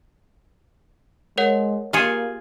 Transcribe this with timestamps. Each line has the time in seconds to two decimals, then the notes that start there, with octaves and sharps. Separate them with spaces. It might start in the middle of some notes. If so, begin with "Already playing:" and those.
1.38 G#3 A#4 C#5 F#5
1.93 A#3 F4 G4 G#4 C#7 E7